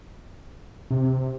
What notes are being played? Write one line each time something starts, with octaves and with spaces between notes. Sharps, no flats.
C3